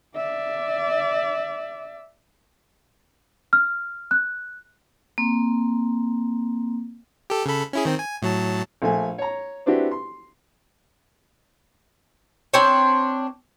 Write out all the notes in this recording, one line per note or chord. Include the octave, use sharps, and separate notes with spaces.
D5 E5
F6
F#6
A#3 C4
G4 A4
C#3 A4 B5
C#4 E4 G#4
D#3 C4
G#5
A2 F#3 A5
A#1 A3 G#5
C#5 A#5
C4 D4 E4 F#4 G4 B4
C6
C4 D4 C5 C#5